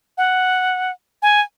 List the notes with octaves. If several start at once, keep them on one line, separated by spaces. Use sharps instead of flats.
F#5
G#5